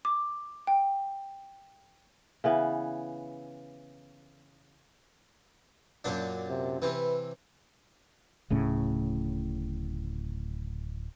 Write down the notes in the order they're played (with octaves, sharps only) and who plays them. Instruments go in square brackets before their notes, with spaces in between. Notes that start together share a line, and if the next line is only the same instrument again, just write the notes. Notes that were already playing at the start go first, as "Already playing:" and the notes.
[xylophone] D6
G5
[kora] C#3 E3 B3
[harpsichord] F#2 A#2 D4
[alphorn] C3
[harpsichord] C3 E3 [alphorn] B4
[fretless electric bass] D1 A2 C#3